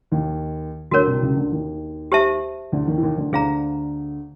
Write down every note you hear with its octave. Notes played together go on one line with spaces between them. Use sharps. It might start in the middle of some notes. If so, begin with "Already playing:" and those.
D#2 D#3
D2 D3 F#4 A#4 C#5
C2 C3
C#2 C#3
D2 D3
D#2 D#3
G4 C5 E5 A5
D2 D3
D#2 D#3
E3
D#2 D#3
D2 D3
D2 D3 G#4 C5 F5 A#5